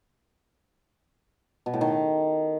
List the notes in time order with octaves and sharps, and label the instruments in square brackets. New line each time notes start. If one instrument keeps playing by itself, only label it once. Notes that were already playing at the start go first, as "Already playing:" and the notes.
[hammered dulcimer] B2
A2
D#3